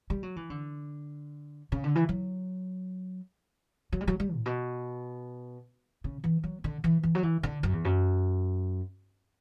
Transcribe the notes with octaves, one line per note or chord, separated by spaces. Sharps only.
G3
F#3
E3
D3
C#3
D3
E3
F#3
F#3
G3
F#3
G3
A2
B2
C#3
E3
F#3
D3
E3
E3
F#3
E3
D3
F#2
E2
F#2